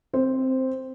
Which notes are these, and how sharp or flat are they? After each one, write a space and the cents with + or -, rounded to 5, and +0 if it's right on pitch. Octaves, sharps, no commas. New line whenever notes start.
C4 +0 C5 +0